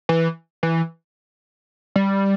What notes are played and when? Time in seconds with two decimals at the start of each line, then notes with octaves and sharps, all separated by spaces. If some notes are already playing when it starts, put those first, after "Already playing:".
0.09 E3
0.63 E3
1.96 G3